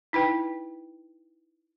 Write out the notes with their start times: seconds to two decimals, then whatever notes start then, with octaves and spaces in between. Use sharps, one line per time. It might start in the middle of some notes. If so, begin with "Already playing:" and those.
0.13 D#4 E4 B4 G5